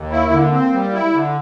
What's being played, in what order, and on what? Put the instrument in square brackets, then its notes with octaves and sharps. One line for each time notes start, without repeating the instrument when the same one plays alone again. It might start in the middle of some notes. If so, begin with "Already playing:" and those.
Already playing: [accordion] D#2
[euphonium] A#3 [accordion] E4
[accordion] D3
C4
G3
E4
D3